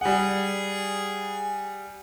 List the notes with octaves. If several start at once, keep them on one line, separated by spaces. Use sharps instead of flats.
G3 G#4 F#5